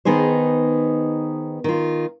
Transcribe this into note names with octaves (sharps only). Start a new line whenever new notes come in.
D#3 B3 D#4 G#4 C5
D#3 F4